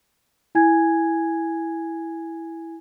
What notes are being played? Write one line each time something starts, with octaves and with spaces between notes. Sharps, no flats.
E4 G#5 G#6